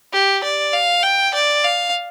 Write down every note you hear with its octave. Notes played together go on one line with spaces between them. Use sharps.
G4
D5
F5
G5
D5
F5